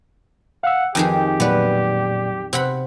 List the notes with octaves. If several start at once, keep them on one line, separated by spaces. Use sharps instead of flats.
F5 F#5 E6
F2 D#3 G4 G#4 G5
A#2 F#3 B3 B4 D5
C3 F#5 B5